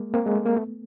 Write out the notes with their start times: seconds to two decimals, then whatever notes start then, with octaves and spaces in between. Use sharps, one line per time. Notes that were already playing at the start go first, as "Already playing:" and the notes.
Already playing: G#3 A#3
0.14 A#3 C4
0.26 G#3
0.36 A3
0.45 A#3
0.56 A3 B3